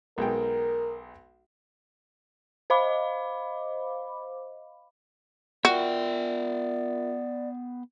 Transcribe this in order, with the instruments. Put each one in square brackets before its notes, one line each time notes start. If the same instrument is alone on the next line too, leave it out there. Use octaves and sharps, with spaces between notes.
[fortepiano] B1 G#3 G5 [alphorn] A#4
[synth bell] C5 D#5 F5 B5 D6
[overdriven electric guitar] B3 G5 [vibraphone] F4 A#4 E5 [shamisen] F#4 [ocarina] D5